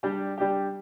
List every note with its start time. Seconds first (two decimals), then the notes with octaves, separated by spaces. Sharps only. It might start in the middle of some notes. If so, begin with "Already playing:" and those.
0.03 G3 D4 G4
0.38 G3 D4 G4